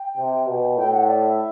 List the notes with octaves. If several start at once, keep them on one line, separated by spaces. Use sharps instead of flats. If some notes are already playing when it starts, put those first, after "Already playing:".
Already playing: G5
C3
B2
A2 G5
F#5
D5
E5